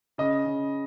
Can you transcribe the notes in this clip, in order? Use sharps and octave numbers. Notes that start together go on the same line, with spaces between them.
C#3 D#5
C#3